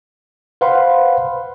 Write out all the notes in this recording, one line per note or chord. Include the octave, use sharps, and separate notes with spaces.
B4 C5 F5 F#5 B5 C6